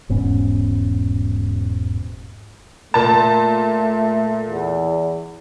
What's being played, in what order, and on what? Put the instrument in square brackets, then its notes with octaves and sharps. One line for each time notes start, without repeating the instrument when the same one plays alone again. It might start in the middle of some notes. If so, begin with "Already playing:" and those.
[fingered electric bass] E1 G#2 B3 C#4
[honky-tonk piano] A#2 A5 [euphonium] A3
[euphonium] E2